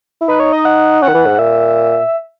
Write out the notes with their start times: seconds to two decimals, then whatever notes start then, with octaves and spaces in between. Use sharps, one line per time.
0.21 E4
0.28 D#4 B4
0.40 C#5
0.53 D#5
0.65 F#5
1.02 C#4 F#5
1.09 D#3
1.14 E3
1.26 G#2
1.39 A#2 E5